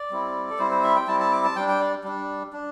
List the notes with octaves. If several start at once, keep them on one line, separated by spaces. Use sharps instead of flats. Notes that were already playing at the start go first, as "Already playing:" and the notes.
Already playing: D5
G3 C4 E4
A4
G3 C4 E4 C5
C5
E5
G5
G3 C4 E4 A5
A5
D6
A5
G3 D4 G5
G5
D5
G3 D4
D4